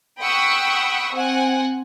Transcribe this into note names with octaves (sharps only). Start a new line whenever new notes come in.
F#5 G5 B5 C#6 D#6 E6
C4 F#5 G#5